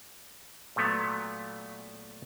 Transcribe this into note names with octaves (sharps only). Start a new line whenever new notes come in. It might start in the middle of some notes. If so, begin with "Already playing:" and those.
A#2 F#3 A3 B3